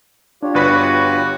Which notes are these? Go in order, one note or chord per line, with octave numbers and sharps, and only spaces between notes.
D4 F4 G4 C#5
G1 F#4 B4 B6